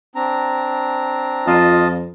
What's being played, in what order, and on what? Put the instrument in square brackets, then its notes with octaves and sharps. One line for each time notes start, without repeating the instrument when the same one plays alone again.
[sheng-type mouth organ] C4 D4 A#5
[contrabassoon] F2 [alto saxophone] F4 [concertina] D#5 A5